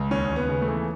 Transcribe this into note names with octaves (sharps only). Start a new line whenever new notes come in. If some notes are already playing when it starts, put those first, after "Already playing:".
Already playing: C#2
D#2 C#4
D#2
B3
C#3
A3
E3